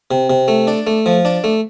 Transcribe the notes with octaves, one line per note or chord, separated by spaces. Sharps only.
C3
C3
A3
D4
A3
F3
D4
A3